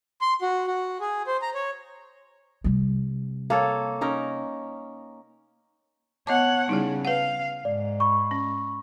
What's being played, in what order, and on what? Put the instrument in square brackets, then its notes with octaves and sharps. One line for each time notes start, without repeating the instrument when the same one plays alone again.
[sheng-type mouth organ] C6
F#4
F#4
G#4
C5
A#5
C#5
[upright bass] C3 G3
[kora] A#3 A4 C#5
C#4 D#4 A#4
[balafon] B3 D#5 D6 [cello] C#5 F#5 [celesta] A5
[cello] C#3 G3 [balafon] D#4 E4 G#4
[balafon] B4 F#5 [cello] F5
[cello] G#2 [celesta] D5
[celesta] B5 C#6
[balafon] C#4